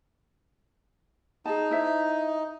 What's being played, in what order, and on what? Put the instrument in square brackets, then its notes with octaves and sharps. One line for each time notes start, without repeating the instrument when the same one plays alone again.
[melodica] D#4 [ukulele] G#4 A5
[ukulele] E4 C5 E5